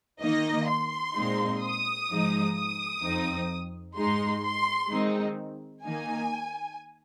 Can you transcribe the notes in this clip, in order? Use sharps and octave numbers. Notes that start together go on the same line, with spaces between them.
D#3 A#3 D#4 D#5
C6
A#2 G#3 C4 D#4
D#6
G#2 F3 G#3 D#4
D#6
F2 F3 C4 D#4
G#2 G#3 D#4 C6
C6
D#3 G#3 C4 D#4
D#3 A#3 D#4 G#5